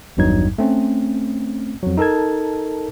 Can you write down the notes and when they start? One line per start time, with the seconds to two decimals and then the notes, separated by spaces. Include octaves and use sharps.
0.17 G#1 E2 G2 F#3 D#4 G#6
0.58 A3 C4 C#4
1.83 F2 F#3
1.98 D#4 A4 A#4 A5 G#6